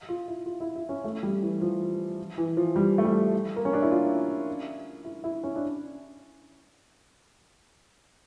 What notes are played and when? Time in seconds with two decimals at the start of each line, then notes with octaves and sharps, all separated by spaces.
0.09 F4
0.28 E4
0.46 F4
0.60 E4
0.75 E4
0.89 C#4
1.04 A3
1.23 G3
1.43 E3
1.61 F3
2.38 E3
2.57 F3
2.76 G3
2.98 A3
3.04 G3
3.56 A#3
3.65 C#4
3.73 D4
3.82 E4
3.91 F4
5.05 E4
5.24 E4
5.44 C#4
5.56 D4